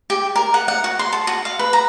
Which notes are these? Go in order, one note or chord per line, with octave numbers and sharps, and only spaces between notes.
G4
A#4
F#5
F#5
F#4
C6
A4
F#4
F5
B4
A#5